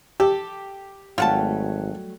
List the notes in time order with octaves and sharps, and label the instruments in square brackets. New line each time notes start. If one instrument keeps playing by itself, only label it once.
[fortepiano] G4 [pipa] A4
[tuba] G#1 [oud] F#3 G3 A3 [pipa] F4 F#5 A5